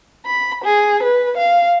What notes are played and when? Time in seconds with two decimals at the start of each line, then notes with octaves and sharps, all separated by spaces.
0.26 B5
0.64 G#4
1.03 B4
1.37 F5